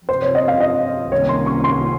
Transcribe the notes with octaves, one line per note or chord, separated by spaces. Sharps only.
F2 C3 F3 C4 C5
C#5
D#5
F5
D#5
C2 C3 D#3 A#3 C#4 C#5
C6
C#6
C6